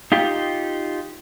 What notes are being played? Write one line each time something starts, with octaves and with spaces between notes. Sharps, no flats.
D#4 F4 G4